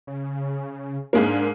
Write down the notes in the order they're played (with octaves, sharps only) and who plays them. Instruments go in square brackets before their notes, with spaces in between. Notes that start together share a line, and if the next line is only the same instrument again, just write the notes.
[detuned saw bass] C#3
[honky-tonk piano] G#2 G#3 A#3 [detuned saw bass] D4